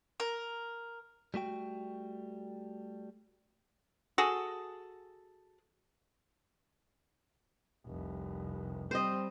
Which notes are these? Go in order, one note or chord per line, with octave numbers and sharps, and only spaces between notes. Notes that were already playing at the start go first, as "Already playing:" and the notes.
A#4
G3 A3 F#4 G5
F#4 G#4 A4
F1 C2
G3 C4 C5 D#5